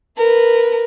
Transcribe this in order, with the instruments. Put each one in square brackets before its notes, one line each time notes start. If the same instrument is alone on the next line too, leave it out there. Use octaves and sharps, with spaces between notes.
[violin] A#4 B4